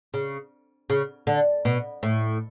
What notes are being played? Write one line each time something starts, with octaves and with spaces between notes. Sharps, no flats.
C#3
C#3
D3
B2
A2